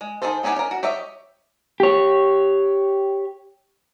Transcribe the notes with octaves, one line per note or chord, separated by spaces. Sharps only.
G#3
D#3 G#3 G#4 A4 C5
B3 C#4 D#4 G4 G#5
C#4 A#4
F#4
G4 C#5 D#5 E5
G4 C#5